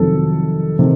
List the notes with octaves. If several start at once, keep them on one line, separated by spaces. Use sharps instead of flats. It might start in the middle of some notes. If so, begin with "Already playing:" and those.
Already playing: F2 C3 D#3 F#3 A4
C3 D#3